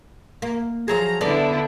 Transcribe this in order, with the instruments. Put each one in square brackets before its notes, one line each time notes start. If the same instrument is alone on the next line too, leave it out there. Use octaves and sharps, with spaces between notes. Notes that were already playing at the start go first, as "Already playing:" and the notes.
[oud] A#3
[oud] F3 F#3 G#4 [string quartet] A#5
[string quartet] D3 D4 E4 [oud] B3 A4 D5